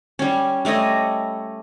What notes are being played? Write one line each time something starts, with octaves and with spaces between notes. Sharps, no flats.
G3 C#4
G3 A3 C#5 D#5